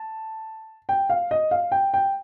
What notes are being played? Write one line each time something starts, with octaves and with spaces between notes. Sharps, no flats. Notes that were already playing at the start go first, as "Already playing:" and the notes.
Already playing: A5
G5
F5
D#5
F5
G5
G5